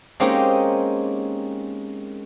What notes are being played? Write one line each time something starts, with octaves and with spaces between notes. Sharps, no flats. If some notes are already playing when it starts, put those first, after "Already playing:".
G#3 A#3 C4 C#4 D#4 G4